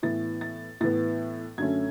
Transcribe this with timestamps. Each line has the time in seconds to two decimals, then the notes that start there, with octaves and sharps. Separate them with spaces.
0.03 A2 E3 B3 A6
0.41 A6
0.81 A2 E3 B3 A6
1.58 F#2 D3 A3 C#4 G#6